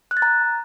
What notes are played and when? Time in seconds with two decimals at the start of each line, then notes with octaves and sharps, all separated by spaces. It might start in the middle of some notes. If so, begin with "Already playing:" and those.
0.11 F#6
0.17 A6
0.22 A#5